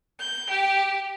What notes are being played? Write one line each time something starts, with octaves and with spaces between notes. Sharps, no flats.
G6
G4